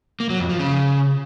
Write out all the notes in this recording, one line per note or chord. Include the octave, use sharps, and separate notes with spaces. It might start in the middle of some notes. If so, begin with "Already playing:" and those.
A#3
F#3
F2
F3
C#3